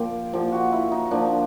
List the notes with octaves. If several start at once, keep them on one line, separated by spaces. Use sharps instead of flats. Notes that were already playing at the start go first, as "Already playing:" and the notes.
Already playing: A#2 F3 G4
A#2 F3 G4
F#4
E4
D#4
A#2 F3 D4